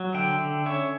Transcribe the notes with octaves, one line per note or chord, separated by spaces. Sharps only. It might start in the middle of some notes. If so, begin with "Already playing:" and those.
Already playing: F#3
D3 E5 G5
D3
C#4 C#5 E5